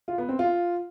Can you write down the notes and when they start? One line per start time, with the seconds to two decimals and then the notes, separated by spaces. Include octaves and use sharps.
0.08 F4
0.18 B3
0.29 C4
0.39 F4